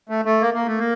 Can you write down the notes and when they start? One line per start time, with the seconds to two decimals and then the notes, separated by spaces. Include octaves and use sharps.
0.09 A3
0.25 A3
0.42 A#3
0.54 A#3
0.66 A3
0.78 A#3